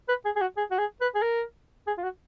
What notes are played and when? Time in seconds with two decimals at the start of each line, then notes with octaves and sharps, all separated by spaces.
0.09 B4
0.25 G#4
0.36 G#4
0.41 F#4
0.57 G#4
0.71 F#4
0.79 G#4
1.01 B4
1.15 G#4
1.22 A#4
1.87 G#4
1.98 F4
2.03 F#4